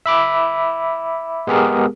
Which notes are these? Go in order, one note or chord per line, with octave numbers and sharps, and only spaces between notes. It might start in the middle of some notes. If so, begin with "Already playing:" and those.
E5 B5 D6
G#3 B3 G4 G#4 A#4